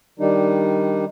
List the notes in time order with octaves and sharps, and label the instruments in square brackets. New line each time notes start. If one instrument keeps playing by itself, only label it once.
[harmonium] D#3 G3 D4 D#4